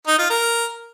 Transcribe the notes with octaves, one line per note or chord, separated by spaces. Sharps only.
D#4
F4
A#4